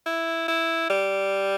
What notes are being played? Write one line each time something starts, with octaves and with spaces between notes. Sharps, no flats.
E4
E4
G3